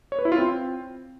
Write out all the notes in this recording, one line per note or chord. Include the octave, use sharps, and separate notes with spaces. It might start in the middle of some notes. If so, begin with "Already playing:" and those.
C#5
B4
E4
F4
C4